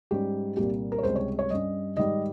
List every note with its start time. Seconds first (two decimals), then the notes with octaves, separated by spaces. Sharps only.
0.11 G#2 G3 C#4 G4
0.57 C2 A#2 G3 A#3 G4
0.92 A#4
0.98 C#5
1.03 C#2 C3 G3 C5
1.16 C#5
1.39 C#5
1.50 G2 G3 C#4 D#5
1.97 G#2 D#3 G3 D#5